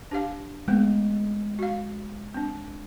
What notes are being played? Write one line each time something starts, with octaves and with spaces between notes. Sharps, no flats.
D4 G4 F5
G#3 A3 B3 C4
F#4 F5
C4 D4